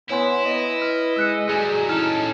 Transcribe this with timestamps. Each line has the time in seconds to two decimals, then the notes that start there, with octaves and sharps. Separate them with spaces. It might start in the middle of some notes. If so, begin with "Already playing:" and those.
0.10 B3 E4 C#5 G#5 C6
0.45 B4 D#5
0.82 F6
1.16 G#3 E6 F#6 C#7
1.49 F#3 G3 G#4 C#7
1.89 C#4 D#4 E4 A4 A5 F6